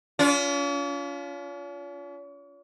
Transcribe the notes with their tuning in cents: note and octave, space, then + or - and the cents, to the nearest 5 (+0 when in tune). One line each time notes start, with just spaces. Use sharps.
C#4 +45 F4 +0